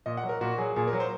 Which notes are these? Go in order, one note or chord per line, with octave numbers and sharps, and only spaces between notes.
A#2 D#5
F#5
F#3
A#4
A#2 F#4
F#3 G#4
A#2 G#4
A#4
F#3
C5